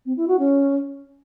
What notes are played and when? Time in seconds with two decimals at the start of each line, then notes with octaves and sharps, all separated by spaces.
0.05 C4
0.17 E4
0.28 F#4
0.39 C#4